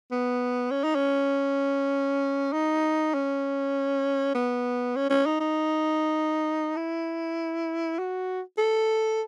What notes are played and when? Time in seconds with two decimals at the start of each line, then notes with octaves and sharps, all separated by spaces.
0.11 B3
0.71 C#4
0.84 D#4
0.95 C#4
2.53 D#4
3.14 C#4
4.35 B3
4.96 C#4
5.10 C#4
5.26 D#4
5.40 D#4
6.76 E4
7.99 F#4
8.58 A4